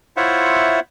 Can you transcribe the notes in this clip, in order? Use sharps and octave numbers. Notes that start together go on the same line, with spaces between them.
E4 F4 C5 C#5 E5 F#5